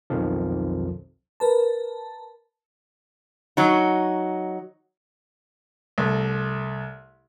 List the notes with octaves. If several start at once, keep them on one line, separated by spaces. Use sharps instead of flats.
B1 F2 D#3 F3
A#4 B4 A5
F#3 D#4
C2 A3